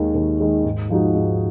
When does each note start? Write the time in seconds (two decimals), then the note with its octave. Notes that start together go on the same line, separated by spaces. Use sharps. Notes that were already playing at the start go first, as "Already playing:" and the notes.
Already playing: D#2 D#3 G#3
0.15 D#2
0.40 D#3 G#3
0.64 G#2
0.90 F3 G#3 D#4 F#4
1.15 G#2